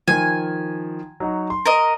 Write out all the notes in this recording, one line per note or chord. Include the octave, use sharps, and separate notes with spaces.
D#3 F3 G#5
F#3 D#4 F#4
C6
A#4 D#5